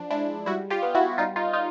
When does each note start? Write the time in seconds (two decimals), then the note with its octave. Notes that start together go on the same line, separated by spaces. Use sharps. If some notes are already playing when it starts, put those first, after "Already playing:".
Already playing: F3 D4
0.11 G#3 D4 E4
0.46 G3 E4 F#4
0.70 F4 G4
0.82 B3
0.95 E4 F#4
1.18 G3 D#4 F4
1.36 D#4 F4
1.53 D#4 F4